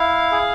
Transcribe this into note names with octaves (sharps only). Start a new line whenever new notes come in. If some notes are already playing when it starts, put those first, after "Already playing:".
Already playing: E4 F5
G#4